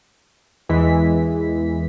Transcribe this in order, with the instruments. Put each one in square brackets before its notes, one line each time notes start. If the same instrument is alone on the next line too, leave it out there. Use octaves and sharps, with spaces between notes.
[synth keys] E2 E3 G#3 B6